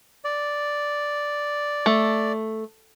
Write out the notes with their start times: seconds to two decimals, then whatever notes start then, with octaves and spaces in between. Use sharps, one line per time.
0.24 D5
1.86 A3